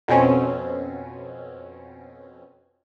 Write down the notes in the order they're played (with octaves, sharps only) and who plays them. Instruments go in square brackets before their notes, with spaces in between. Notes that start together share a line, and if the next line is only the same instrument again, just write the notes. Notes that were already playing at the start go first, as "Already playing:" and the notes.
[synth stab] F2 B2 C4 C#4